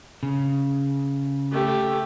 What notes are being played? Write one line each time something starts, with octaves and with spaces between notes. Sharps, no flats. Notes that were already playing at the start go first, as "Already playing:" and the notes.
C#3
A3 G4